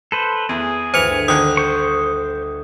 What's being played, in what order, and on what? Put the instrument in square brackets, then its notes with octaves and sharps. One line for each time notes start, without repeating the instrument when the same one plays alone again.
[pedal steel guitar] A4 B4 C5
[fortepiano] E2 [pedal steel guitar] G#4
[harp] G1 D2 [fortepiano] E3 [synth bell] C5 C#7 F7
[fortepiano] D3 D#3 [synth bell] D#6
[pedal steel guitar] C5 C#6